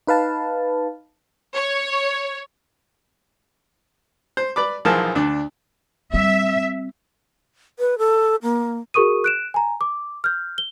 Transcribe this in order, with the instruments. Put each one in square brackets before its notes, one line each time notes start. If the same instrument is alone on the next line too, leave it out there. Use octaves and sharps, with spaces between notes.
[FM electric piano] D#4 B4 F5 A5
[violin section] C#5
[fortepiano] C5
B4 D5 B5 D6
B1 E3 F3 G#4 A#4 A5
D2 D4
[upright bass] G3 C4 [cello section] E5
[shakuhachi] B4
A4
A#3
[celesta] F#4 G#4 A#4 C#6 D#6 D#7
F#6 D7 E7
G#5 A#5
D6
F6 G6
G7